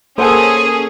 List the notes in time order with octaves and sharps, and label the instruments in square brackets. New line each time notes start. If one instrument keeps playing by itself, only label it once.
[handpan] A#3 A4 [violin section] C#4 G#4 [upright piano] C5 F#5 G#5 [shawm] D#6